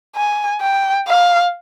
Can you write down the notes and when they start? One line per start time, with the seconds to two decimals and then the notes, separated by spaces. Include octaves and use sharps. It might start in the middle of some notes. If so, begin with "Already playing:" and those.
0.16 G#5
0.61 G5
1.07 F5